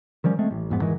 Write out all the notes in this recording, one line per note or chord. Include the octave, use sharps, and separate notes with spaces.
D#3 F3 G3 C#4
G#3 A3 C4
A1
G#1 F2 G#2 B3
G#2 D#3 E3 G#3